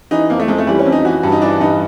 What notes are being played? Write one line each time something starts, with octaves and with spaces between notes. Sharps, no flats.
E3 D#4
F2 A#3
A3
F2 G#3
A3
E3 G3
C#4
F2
D#4
E3 F#4
G2
D#4
E3 D4
G2 D#4